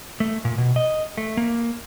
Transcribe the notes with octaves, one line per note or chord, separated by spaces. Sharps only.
A3
A#2
B2
D#5
A3
A#3